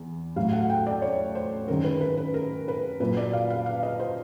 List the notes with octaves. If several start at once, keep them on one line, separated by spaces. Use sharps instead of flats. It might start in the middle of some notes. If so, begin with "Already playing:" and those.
Already playing: E2
A2 F#3 A3 F5
F#5
G5
D5
C#5
C5
F#2 D#3 G#3 A#4
B4
B4
B4
A#4
B4
A#2 F#3 A#3 B4
D5
F5
F5
F5
D#5
C5